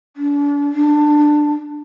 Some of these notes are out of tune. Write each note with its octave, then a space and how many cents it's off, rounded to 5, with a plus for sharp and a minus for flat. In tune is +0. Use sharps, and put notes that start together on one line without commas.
D4 -40
D4 +15